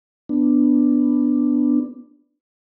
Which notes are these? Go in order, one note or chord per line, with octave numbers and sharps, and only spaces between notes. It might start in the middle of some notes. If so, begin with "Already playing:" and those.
B3 D4